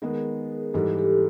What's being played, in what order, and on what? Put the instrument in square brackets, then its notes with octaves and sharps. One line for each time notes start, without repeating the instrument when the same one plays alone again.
[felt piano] D#3 G#3 B3 [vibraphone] G#4 A#4
[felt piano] G#2 E3 G3 [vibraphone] G4 A4
[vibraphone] G4 A4